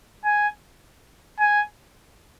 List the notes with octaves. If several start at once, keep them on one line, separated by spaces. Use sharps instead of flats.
G#5
G#5